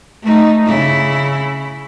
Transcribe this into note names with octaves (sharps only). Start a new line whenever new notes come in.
A3 D#4
C#3 E4